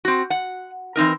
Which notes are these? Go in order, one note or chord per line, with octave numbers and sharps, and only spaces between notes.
C4 F#4
F#5
E3 C4 D#4 A#4